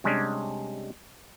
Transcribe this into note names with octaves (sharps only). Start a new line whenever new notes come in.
C3 G3 G#3 C#4 D4